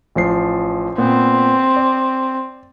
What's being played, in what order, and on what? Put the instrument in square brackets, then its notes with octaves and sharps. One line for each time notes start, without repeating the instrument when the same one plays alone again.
[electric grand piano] A1 F3 C7
[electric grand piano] A#2 B3 [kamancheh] C4
[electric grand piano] D5